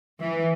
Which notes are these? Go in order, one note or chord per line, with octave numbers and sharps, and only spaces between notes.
E3